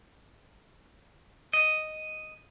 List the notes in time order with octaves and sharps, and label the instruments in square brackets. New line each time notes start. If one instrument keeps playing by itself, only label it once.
[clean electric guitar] D#5